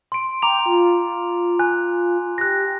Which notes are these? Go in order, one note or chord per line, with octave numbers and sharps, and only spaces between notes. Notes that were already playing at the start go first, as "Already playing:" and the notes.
C6 D7
G5 A#5 D6 F7
F4
G#5 F#6
G4 F#6 A#6